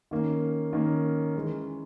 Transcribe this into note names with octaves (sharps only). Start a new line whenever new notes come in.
D#3 A#3 C#4
D#3 A#3 C#4
E3 G#3 C#4